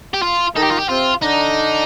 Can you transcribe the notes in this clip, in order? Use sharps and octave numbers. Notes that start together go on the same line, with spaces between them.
G4
F4
D#3 D#4 A4
G4
F4
G4
C3 C4 F4
D3 D4 D#4